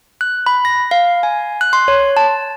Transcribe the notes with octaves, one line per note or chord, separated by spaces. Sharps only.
F#6
B5
A#6
F5
G#5
F#6
C6
C#5
A5